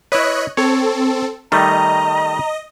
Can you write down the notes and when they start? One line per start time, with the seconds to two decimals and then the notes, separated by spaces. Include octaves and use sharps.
0.12 E4 B4 C#5 D#5 F#6
0.57 C4 A4 C#5
1.52 D#3 G3 A3 D#5 A#5